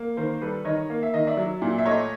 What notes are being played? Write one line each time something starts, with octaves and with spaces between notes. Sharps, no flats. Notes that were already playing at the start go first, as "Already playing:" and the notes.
Already playing: A#3
D#3 A#4 C5
G3 A4 B4
D#3 C#5 D#5
A#3
E5
D#3 D#5
D5 E5
F#3
A#2
E5
A3 C#5 D#5